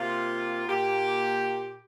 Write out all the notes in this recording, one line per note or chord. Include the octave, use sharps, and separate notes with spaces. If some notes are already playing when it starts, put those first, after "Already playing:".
Already playing: C3 A#3 F4
A#2 A#3 G4